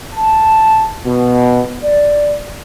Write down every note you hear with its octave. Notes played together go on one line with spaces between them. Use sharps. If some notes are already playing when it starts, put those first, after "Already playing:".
A5
B2
D5